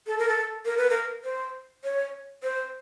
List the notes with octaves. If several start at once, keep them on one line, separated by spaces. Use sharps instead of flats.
A4
A#4
A4
A#4
B4
A#4
C5
C#5
C5